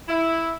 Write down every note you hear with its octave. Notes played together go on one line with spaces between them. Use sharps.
E4